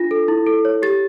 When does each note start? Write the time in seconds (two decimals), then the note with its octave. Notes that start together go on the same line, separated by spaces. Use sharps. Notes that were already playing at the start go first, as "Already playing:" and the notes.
Already playing: D4 F4 A#6
0.11 A4
0.28 E4
0.47 A4
0.65 C#5
0.82 G4 A6